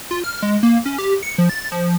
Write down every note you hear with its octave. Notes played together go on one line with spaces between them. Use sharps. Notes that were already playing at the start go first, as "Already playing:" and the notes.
F4
F6
G#3
A#3
C#4
G4
C#7
F3
A6
F3